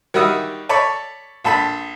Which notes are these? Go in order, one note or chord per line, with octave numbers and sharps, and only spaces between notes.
D#3 G3 F#4 E5 D#6
A4 C#5 D5 B5
A#1 A4 B5